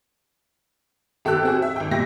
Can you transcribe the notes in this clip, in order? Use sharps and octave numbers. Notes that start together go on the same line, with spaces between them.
G#1 G4 A4 E6 F#6
C4 F#4 G#4
E5
G#1 G5
A#2 G3 E5 A#6